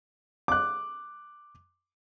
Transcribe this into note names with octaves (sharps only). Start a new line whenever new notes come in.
D6 F#6